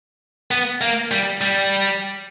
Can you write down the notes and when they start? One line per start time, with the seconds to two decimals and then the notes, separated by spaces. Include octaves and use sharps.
0.51 B3
0.81 A#3
1.11 G3
1.41 G3